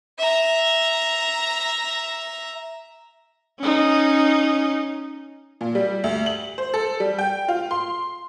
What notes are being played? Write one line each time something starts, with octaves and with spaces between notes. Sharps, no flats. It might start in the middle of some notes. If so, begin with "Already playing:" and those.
E5 A#5
C#4 D#4
A#2
G3
D2
F#7
C5
A4
G3
G5
F4
C6